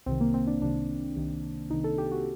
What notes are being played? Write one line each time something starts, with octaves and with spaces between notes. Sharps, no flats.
C2 C3 D#3 C4
A#3
C4
D4
C2 C3 D#3 D4
C2 C3 D#3
C2 C3 D#3 D#4
A4
G4
F#4